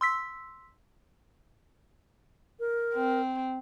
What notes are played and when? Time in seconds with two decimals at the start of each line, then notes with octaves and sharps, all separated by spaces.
0.01 C6 E6 B6
2.60 A#4
2.94 C4